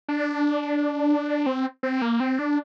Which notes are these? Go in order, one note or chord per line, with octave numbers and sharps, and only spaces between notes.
D4
C4
C4
A#3
C4
D4